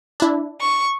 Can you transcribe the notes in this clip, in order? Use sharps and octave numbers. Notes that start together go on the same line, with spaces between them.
D4 E4
C#6